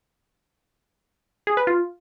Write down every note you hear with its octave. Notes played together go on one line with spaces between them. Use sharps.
G#4
B4
F4